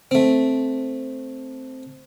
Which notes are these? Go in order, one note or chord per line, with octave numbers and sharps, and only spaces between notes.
A3 C4